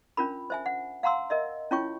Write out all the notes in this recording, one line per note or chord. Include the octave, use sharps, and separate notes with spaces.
C#4 D4 F4 A#4 B5
C5 E5 G#5
F#5
F5 F#5 A#5 C6 E6
A#4 D#5 E5
C#4 E4 F4 C#5 G5 C#6